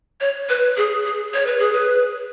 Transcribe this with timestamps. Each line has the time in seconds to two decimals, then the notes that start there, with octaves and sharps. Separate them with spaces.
0.21 C#5
0.49 B4
0.77 G#4
1.06 G#4
1.34 C#5
1.47 B4
1.59 G#4
1.73 B4